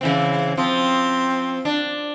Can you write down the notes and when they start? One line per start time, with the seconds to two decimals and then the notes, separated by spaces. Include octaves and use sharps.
0.01 C#3 E3 C4
0.57 F3 C4
1.65 D4